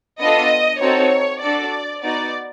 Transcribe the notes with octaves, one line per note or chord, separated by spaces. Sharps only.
B3 D4 F4 A4 D#5
C4 D#4 F#4 A4 C#5
D4 F#4 A4 D5
B3 D#4 F#4 D5